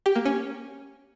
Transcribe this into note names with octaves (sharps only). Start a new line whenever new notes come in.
G4
A#3
C#4